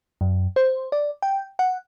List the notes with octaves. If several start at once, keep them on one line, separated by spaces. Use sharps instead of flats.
F#2
C5
D5
G5
F#5